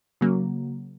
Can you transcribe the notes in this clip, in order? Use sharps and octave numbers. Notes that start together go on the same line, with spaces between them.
C#3 F#3 A#3